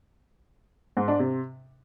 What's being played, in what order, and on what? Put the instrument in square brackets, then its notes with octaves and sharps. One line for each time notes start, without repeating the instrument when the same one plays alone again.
[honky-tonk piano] G#2
D4
C3